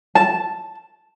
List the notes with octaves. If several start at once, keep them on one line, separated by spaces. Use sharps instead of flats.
A5